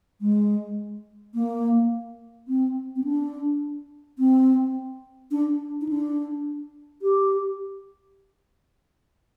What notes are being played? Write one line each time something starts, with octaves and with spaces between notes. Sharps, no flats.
G#3
A#3
C4
C4
D4
C4
D4
D#4
D4
G4